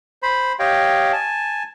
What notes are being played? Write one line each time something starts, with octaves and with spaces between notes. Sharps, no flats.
C5 B5
G4 C#5 D#5 F5 G5
G#5 A5